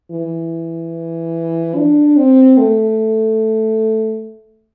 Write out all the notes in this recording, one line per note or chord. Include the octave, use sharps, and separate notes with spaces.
E3
D4
C4
A3